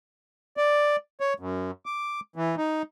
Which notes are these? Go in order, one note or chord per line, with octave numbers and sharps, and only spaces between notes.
D5
C#5
F#2
D6
E3
D#4